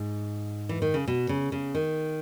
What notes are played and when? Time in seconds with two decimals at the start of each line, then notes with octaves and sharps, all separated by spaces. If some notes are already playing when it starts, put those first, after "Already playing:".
Already playing: G#2
0.69 E3
0.82 D#3
0.94 C#3
1.08 B2
1.29 C#3
1.52 C#3
1.75 D#3